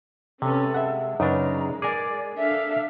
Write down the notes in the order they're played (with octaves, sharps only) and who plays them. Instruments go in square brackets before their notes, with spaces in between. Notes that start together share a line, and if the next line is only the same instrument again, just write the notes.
[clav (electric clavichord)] C3 [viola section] C#4 B4 [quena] A4
[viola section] G#3 [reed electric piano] E5 F#5
[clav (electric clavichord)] F#2 C#3 D4 [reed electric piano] D#4 B4 [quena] A#5
[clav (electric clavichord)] G#4 A#4 [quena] D5 [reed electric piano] G#5 D6
[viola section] D4 A4 F5 [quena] E5